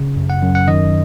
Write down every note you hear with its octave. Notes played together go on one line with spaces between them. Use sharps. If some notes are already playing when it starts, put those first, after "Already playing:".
Already playing: C#3
F#2
F#5
F#2
F#5
D#3 D#5